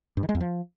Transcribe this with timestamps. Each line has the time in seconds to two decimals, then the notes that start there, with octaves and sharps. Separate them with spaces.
0.17 G2
0.23 D#3
0.29 G#3
0.35 E2
0.40 F3